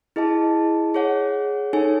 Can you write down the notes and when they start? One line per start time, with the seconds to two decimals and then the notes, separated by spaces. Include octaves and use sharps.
0.16 E4 G#4 D#5 A5
0.94 G#4 C#5 F#5
1.73 D#4 A4 C#5 G#5